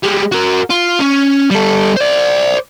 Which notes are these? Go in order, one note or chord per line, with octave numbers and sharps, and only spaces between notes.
G3 G#3
F#4 A#4
F4
C#4
G3 A4
C5 D5